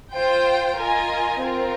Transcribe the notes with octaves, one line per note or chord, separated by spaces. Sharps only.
F4 C5 G5
F4 A#4 D#5 G#5
C4 F4 A#4